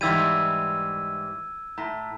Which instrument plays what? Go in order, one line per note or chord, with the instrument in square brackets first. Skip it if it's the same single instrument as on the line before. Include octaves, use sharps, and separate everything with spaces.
[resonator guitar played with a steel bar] G#2 E3 G3 [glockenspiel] E6 G#6 D#7
[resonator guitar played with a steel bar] A2 [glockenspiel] A#5